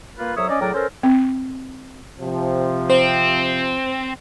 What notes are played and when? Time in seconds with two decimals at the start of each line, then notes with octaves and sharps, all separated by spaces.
0.17 A#3 F4 B4
0.35 C2 F#3 A4 C#5 E5 D#6
0.48 C#4 D5 D#5
0.60 A2 F#3 G#4 A#4 D5 G5
0.73 C#4 A4 A#4 C5
1.03 C4
2.21 C3 F3
2.90 C4 C5